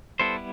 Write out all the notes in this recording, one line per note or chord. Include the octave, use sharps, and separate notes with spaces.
G3 B3 E4 A4 C5